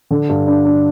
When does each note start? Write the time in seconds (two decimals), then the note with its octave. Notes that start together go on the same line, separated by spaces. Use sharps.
0.11 D3
0.29 G2
0.47 D4
0.65 D4